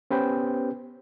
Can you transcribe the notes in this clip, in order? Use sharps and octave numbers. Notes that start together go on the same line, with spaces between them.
B3 C#4 G4 B4 C5 G5